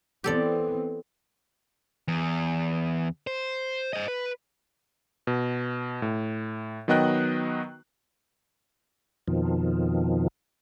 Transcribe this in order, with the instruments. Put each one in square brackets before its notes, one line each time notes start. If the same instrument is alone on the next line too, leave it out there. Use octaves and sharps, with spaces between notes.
[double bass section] E3 B3 C4 [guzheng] G4 A4 D5
[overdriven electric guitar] E2
C5
C5 D#5
B4
[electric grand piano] B2
A2
D#3 F#3 B3 D#5 G5 F#6
[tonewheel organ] F2 B2 D#3 F3